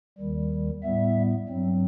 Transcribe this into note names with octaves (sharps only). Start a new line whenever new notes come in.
D#2 D#3 G3
A2 G3 B3 E5
G2 F#3 C4